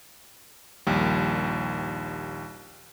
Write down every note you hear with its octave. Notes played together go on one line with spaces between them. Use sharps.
A#1 D#2 G3